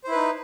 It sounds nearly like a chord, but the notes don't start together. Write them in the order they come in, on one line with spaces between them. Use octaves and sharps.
C5 E4 B4 D#4